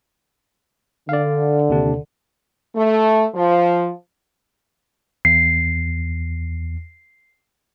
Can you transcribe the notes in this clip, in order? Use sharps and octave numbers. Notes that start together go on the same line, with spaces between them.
D3 D5 F5
D#2 C3 D4
A3
F3
E2 C7